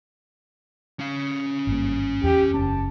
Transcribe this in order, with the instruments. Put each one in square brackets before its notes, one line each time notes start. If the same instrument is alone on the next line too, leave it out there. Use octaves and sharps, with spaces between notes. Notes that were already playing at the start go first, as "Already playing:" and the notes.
[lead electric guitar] C#4 F5
[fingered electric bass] G#1 G2 A#3
[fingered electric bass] E2 [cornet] G4
[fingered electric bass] F#1 C#4 [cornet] A5